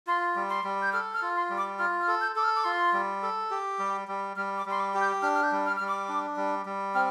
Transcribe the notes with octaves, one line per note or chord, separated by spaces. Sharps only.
F4 C6
G3
C6
G3
G6
A4 F6
F6
F4
C6
G3
D6
F4 F6
F6
A4
G6
A4 D6
F6
D6
F4 C6
G3
A4
G4
G3
G3
G3 F6
D6
G3 C6
D6
G4
G6
D4 F6
F6
G6
G3
F6
G3 F6
D6
D4
G3
G3
C4 F6